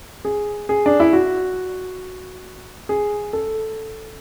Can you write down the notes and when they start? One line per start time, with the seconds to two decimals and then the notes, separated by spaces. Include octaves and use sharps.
0.25 G#4
0.69 G#4
0.86 D4
1.00 E4
1.13 F#4
2.89 G#4
3.33 A4